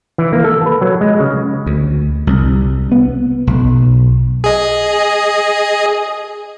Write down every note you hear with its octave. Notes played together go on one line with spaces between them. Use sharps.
E3
A#3
A4
B4
F#3
G#3
C#3
D2
C2
B3
B1
G#4 D#5